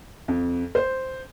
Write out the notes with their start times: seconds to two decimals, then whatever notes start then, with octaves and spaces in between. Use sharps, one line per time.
0.28 F2
0.75 C5